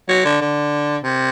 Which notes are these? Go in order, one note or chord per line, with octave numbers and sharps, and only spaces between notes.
F#3
D3
D3
C3